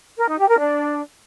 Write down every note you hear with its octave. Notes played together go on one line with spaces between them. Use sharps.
A#4
D#4
G4
A#4
D4